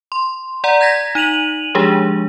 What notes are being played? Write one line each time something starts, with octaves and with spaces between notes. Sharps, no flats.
C6
D5 F#5 A#5
G6 G#6 A#6 B6
D#4 D#7 F7 F#7
F3 G#3 D4 G4 G#4